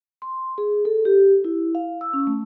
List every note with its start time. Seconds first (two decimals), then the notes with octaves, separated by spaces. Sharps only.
0.22 C6
0.58 G#4
0.85 A4
1.05 G4
1.44 E4
1.75 F5
2.01 E6
2.13 C#4
2.27 A3